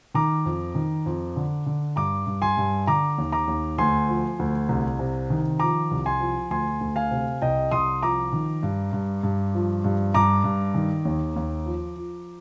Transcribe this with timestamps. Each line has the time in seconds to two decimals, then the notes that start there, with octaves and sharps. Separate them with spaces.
0.14 D#3 A#5 D6
0.46 F2
0.75 D#3
1.06 F2
1.36 D3
1.66 D3
1.96 G2 A#5 D6
2.27 G2
2.42 G#5 C6
2.57 G2
2.87 D3 A#5 D6
3.18 D#2
3.32 A#5 D6
3.47 D#2
3.78 D2 G#5 C6
4.08 F3
4.39 D2
4.69 C2
4.99 C3
5.30 D#3
5.59 F3 A#5 D6
5.91 C2
6.06 G#5 C6
6.20 F3
6.50 D2 G#5 C6
6.81 D2
6.96 F5 G#5
7.11 C3
7.42 C2 D#5 G5
7.71 C2 C6 D#6
8.03 F3 A#5 D6
8.33 D#3
8.63 G2
8.93 G2
9.23 G2
9.54 F3
9.84 G2
10.14 G2 A#5 D6
10.44 G2
10.74 D#3
11.05 D#2
11.36 D#2
11.66 F3
11.96 F3